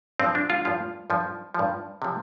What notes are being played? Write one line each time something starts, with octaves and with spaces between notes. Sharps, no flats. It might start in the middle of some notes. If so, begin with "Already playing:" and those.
G2 F3 C4
D4
F4
G2 F3 F4
G2 F3
G2 F3
C3 F3